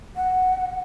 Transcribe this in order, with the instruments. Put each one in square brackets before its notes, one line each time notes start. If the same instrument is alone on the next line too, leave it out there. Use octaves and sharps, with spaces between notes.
[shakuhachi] F#5